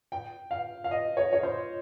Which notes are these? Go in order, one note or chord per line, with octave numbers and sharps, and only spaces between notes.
G5
F5
F5
D#5
C#5
C#5
C5